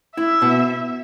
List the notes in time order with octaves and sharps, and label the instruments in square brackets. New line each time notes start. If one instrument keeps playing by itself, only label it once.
[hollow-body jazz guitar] E4 [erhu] E5
[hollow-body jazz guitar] B2